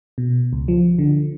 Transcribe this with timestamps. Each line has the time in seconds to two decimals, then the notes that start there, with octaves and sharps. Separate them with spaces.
0.18 B2
0.53 C#2
0.68 F3
0.99 D3